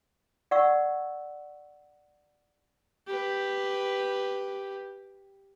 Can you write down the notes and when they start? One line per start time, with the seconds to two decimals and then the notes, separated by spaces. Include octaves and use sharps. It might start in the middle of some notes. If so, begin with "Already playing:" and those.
0.51 D5 F#5 C#6 E6
3.07 G4 B4